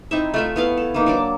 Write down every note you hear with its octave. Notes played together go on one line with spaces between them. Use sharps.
C4 D#4 E4 E5
A3 F4 E5
B3 E4 F5
A4
E3 A#3 D#4
F#3 D4 D6